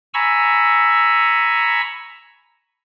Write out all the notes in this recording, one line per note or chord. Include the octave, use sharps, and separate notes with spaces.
G#5 A#5 B5 C#6 E6